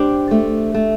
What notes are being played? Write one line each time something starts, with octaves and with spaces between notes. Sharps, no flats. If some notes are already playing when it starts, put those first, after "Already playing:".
Already playing: C4 D4 G4
A3
A3